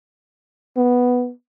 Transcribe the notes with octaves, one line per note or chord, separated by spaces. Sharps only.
B3